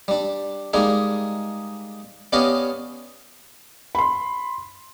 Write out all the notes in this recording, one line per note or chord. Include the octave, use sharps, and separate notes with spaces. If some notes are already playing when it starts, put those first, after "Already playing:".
G3 D4
G3 G#3 A#3 D#4 G#4
B3 C#4 G4 D5 D#5 F5
B5 C6